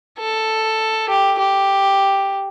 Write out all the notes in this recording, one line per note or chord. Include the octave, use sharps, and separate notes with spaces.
A4
G4
G4